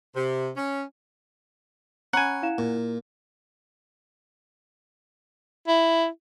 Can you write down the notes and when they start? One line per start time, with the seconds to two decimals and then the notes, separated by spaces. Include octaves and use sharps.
0.15 C3
0.57 C#4
2.13 C#4 F#5 G#5 A#5 B5
2.42 E4 F5 E7
2.58 A#2
5.68 E4